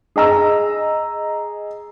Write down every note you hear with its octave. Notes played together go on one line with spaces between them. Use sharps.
G#4 D#5 A#5 E6